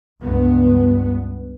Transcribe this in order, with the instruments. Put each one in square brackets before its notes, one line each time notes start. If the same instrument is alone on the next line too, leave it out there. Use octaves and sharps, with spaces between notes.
[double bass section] C#2 G2 B3